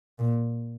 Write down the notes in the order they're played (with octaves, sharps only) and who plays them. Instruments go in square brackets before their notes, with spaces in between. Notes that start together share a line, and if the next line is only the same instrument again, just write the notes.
[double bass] A#2